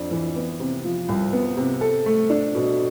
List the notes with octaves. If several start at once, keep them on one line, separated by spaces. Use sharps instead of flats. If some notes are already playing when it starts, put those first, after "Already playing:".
Already playing: F2 D4
E3
B3
C3
F3
C2
B3
C3
A4
A3
D4
B2